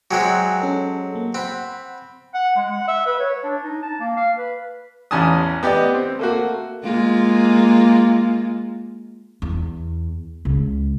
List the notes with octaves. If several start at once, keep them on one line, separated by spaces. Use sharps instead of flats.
F#3 G#3 C4 G5 G#5 F#6
C#4 A4
A#3
C4 F#5 B5
F#5
G#3
F#5
E5
B4
C#5
D4
D#4
A5
A#3
F5
B4
A1 E2 C#4 G#5 A5 D#6
B3 G4 D5 D#5
C4
A3 A#3 F#4
G#3 A#3 F4
E2
C#2